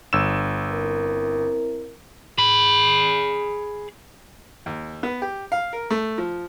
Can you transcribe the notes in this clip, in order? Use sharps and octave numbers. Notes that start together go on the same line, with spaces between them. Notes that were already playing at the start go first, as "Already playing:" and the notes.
G1 E6 E7
C4 E4 A#4
G#4 B5
D#2
B3
G4
F5
A#4
A3
F3